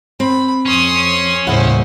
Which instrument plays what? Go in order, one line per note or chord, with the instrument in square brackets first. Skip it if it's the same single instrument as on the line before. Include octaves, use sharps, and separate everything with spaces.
[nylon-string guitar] C4 [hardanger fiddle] B5
[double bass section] F2 [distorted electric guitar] C#4 [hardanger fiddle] C6 D#6
[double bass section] D#2 A2 G3 [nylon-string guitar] C#3 F#5 [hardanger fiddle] E4 C5